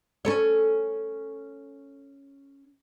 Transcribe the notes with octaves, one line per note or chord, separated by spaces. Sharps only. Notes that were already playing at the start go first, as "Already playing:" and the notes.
C#4 A4 C#5